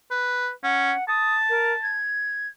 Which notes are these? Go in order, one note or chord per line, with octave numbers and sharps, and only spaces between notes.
B4
C#4 F#5
A5 D#6
A#4
G#6